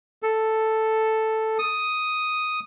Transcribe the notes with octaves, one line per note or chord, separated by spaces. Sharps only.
A4
D#6